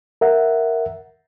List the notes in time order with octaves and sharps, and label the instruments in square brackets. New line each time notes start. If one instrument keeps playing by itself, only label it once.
[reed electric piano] A#4 E5 F#5